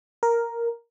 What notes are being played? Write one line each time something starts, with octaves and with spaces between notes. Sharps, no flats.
A#4